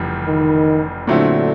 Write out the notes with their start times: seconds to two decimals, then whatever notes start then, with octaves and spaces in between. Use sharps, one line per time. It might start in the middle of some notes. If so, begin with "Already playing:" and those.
Already playing: F1 F2 C#3 E3 G3
0.26 D#3
1.07 A#2 D3 F#3 A3 C4 E4